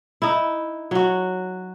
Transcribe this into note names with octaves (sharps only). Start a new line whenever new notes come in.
D#4 E4
F#3 F#4